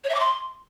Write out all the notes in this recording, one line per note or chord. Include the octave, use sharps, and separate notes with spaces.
C#5
E5
D6
C6